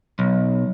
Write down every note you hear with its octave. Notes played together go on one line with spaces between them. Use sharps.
B1